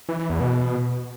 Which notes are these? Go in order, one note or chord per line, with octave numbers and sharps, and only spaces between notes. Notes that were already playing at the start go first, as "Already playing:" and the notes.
E3
E3
E2
B2